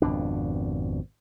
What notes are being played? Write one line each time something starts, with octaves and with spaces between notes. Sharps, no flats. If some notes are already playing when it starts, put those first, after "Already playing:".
G#1 F2 B2 D4